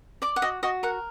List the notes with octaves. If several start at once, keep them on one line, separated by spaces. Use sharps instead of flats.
D5 D6
F#5
F#4 D#5
F#4 D#5
A#4 F#5